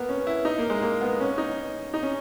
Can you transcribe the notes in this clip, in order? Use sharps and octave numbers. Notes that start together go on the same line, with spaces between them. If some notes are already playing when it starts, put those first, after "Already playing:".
Already playing: A#3 B3
C#4
E4
D#4
A#3
G#3
A#3
B3
C#4
D#4
D#4
C#4